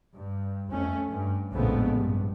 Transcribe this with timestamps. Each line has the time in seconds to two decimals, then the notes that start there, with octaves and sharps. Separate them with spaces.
0.16 G2
0.72 F2 A3 C#4
1.09 G2
1.53 A#1 F2 A2 C#3 G#3 B3
1.97 G2